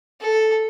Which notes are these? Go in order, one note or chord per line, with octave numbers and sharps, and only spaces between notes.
A4